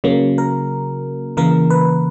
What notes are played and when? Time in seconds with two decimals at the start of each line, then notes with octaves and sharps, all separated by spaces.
0.04 C#3 F#3 A#3
0.38 A#4
1.37 C#3 E3 A#3 A#4
1.70 B4